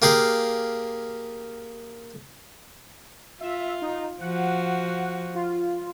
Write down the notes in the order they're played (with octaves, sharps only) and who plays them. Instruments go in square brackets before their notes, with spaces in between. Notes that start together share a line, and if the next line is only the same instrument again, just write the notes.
[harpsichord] A#3 G4 G#4 F5
[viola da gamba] F4 [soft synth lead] E5
[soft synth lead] D#4
[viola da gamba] F3 F#4 [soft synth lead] F#5
[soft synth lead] F4